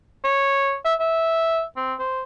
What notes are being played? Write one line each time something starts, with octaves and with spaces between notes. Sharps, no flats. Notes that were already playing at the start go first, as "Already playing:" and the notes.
C#5
E5
E5
C4
C5